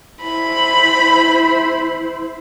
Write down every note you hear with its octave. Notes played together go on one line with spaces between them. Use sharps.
E4 C5 B5